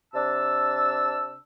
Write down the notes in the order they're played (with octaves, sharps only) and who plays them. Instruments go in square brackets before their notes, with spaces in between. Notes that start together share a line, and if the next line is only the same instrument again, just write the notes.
[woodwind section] C3 D4 A5 E6